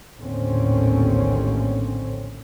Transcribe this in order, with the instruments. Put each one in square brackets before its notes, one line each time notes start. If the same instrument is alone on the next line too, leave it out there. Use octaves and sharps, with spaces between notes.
[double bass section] A#1 D#2 A2 D3 C4 C#4